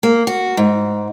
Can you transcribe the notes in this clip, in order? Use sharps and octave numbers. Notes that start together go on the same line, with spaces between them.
A#3
F#4
G#2